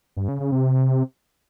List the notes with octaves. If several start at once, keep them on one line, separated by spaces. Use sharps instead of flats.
G2
C#3
C#3
C3